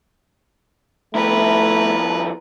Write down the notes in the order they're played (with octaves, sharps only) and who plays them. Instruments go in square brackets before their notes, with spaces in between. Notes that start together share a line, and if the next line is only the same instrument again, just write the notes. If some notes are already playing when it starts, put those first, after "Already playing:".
[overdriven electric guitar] F2 E4 [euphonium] A3 [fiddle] A#4 B4